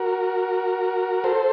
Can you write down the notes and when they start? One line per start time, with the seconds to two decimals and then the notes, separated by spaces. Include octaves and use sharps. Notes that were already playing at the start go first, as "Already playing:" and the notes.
Already playing: F#4 A#4
1.24 A4 C5